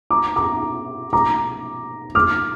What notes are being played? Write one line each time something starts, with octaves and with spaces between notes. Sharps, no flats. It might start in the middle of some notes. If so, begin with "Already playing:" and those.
A#5 D6
A#5 D6
A#5 D6
D6 F6